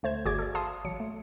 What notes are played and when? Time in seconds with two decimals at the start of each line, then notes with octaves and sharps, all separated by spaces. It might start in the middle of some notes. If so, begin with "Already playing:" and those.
0.03 D2 A3 C5 G#6 E7
0.25 G1 F#4 G#4 D5 D6 G#6
0.39 A4 D5
0.55 F5 A5 C6 D#6
0.84 A1 F#3 C#7
1.00 A3